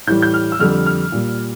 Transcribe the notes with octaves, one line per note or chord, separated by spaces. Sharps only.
A2 E3 G3 G6
G6
F6
E6
F2 D3 G3 F6
F6
A#2 G3